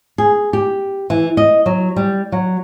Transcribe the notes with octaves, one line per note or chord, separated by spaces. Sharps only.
G#4
G4
E3
D#5
F#3
G3
F#3